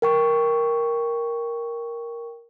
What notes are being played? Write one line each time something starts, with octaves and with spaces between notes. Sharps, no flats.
A#4 G5 C#6